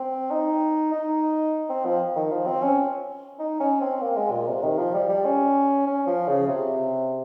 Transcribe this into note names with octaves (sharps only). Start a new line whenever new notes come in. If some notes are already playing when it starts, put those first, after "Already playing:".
Already playing: C4
D#4
D#4
C4
F3
D#3
F3
C4
C#4
D#4
C#4
C4
A#3
G#3
A#2
C3
D#3
F3
G3
G3
C#4
C#4
F3
C#3
C3